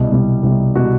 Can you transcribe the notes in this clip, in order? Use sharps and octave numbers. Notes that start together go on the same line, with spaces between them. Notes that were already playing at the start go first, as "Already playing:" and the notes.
Already playing: C2 B2 G3
C2 B2 G3
C2 B2 G3
B2 G3 F#4